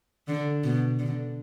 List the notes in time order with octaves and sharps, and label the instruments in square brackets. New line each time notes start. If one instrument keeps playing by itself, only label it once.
[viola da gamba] D3
B2
D3